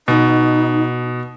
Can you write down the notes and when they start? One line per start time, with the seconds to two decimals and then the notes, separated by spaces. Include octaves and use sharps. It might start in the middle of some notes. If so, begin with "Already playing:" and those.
0.08 B2 D#4